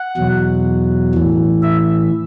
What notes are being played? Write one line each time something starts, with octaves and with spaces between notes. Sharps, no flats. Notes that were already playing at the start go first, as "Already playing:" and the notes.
Already playing: F#5
E2 B2 F#3
A2 E3
E5